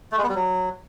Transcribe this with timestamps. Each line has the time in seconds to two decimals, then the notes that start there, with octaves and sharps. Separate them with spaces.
0.12 A3
0.18 G#3
0.23 B3
0.29 G3
0.35 F#3